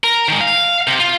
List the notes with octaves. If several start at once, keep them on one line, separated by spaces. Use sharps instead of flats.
A#4
D#3 G#3
F5
C3
F4